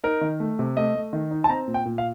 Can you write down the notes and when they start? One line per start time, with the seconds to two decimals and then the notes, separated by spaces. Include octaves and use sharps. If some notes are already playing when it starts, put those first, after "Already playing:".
0.04 D#4 A#4
0.21 D#3
0.40 A3
0.59 C3
0.77 A3 D#5
0.95 A3
1.13 D#3
1.31 D#4
1.44 A5
1.49 C4 A#5
1.68 A#2
1.74 G5
1.85 A#2
1.98 F5